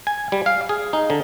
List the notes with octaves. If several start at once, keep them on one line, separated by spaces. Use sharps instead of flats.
G#5
G3
F5
G#4
D#4
D3